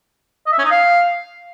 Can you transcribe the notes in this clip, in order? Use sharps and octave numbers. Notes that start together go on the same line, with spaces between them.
D#5
E5
C#4
D#4
F5